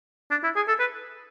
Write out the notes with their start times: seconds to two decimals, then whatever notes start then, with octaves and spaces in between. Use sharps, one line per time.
0.31 D4
0.43 E4
0.56 G#4
0.68 A4
0.80 B4